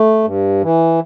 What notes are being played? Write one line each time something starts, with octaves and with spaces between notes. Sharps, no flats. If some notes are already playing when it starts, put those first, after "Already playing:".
Already playing: A3
G2
E3